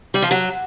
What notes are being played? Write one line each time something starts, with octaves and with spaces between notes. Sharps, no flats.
G3
F3
F#3